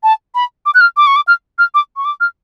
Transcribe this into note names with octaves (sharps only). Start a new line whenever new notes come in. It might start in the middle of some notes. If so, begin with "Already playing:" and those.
A5
B5
D6
F#6
F6
D6
C#6
D6
F6
F6
D6
C#6
D6
F6